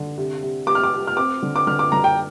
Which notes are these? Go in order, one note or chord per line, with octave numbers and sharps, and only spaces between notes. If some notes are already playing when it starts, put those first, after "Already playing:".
Already playing: D3
C3
C3
C3 D6
F6
D6
C3
F6
C4 D6
D3
D6
D3 F6
D6
D3 A#5
G5